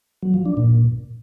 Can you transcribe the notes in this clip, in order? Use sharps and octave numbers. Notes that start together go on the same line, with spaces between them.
F#3
F3
D4
A#2